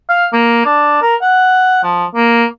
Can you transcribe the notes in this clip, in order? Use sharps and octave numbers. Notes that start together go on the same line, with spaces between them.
F5
A#3
D4
A#4
F#5
F3
A#3